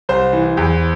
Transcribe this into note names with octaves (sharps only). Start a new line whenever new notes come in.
C2 C5
E3
E2